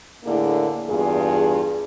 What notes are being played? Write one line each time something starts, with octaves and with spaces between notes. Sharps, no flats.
A2 D3 A#3 D4 E4 G#4
E2 G2 F4 G#4